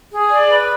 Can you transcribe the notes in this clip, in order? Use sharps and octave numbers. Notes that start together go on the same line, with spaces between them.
G#4
D5
B4